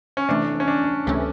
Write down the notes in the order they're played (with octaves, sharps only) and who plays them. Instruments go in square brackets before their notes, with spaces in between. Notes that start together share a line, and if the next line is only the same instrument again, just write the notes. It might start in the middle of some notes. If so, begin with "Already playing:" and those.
[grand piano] C#4
[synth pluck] C3 E3 A3 [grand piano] D4
[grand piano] C#4
D4
[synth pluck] C#2 C3 E3 A3 C#4